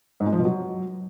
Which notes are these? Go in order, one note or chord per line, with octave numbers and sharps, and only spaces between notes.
G#2
G#3
F3
B2
F#3